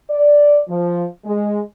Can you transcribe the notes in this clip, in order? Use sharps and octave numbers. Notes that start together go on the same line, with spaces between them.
D5
F3
G#3